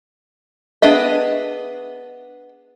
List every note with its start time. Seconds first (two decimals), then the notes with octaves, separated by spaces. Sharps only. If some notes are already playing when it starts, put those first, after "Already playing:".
0.82 B3 D4 G#4 D#5 E5